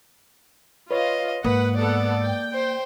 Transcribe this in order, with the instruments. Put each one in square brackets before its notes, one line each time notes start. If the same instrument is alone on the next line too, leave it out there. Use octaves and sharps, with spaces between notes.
[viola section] F4 [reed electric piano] B4 C#5 [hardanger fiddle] D#5 F5
[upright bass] G#2 [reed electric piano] A#3 D#6 [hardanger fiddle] B4 [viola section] F#5
[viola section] B3 A4 F#5 [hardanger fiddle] D5
[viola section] G5
[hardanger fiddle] C5